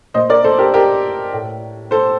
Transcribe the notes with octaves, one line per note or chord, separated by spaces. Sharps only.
A#2 C5 D#5
A#4 D5
A4 C5
G4 A#4
G4 A#4
A2
A4 C5